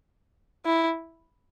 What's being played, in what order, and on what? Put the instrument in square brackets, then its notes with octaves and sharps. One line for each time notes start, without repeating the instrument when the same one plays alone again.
[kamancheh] E4